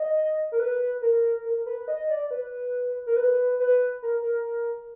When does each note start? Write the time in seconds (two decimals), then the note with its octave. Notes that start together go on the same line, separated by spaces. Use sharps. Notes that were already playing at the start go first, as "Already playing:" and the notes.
Already playing: D#5
0.52 A#4
0.59 B4
1.02 A#4
1.45 A#4
1.66 B4
1.88 D#5
2.10 D5
2.31 B4
3.06 A#4
3.16 B4
3.59 B4
4.03 A#4
4.22 A#4